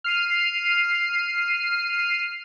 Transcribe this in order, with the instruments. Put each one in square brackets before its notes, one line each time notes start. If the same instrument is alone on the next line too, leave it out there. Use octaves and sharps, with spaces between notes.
[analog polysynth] F6 C7 D#7